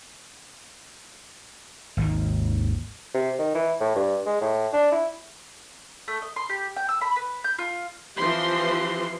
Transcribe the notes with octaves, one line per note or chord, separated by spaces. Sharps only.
G#1 D#2 D#3
C3
D#3
E3
A2
G2
G#3
A2
D4
E4
A3
D#5
C6
G4
G5
E6
B5
B4
G6
F4
E3 F3 C4 G4 C6